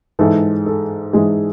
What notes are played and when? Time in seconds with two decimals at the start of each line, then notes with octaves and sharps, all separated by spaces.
0.19 G#2 E3 G#3 A4
0.66 A4
1.13 G#2 E3 G#3 G#4